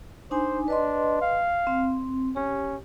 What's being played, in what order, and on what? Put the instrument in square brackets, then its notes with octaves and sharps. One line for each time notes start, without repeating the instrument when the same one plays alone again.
[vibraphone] D4 D#4 G#5 [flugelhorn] C5
[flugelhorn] D4 [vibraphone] B4 D#5 C6
[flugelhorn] F5
[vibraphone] C4
[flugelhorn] C#4 [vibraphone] G4